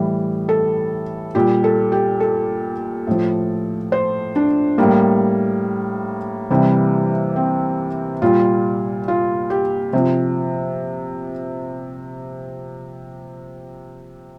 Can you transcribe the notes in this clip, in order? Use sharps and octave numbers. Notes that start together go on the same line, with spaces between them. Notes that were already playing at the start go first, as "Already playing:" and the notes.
Already playing: A2 E3 G3
A4
A#2 G3 G4
A4
G4
A4
A2 F3
C5
D4
A2 G3 A#3
C3 E3 G3
C4
A#2 G3 F4
F4
G4
C3 F3